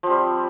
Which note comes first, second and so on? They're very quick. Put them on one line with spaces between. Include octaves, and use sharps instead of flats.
F3 C4 G3